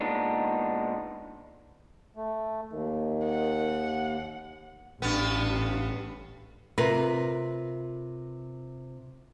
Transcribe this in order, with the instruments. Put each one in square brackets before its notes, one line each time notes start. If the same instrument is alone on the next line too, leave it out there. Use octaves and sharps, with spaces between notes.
[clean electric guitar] A#2 G#3 B3 D4 D#4
[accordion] A3
[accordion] D#2 [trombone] D#3
[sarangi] F#5
[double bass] A1 [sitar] G2 B3
[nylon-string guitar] C3 F4 A#4 B4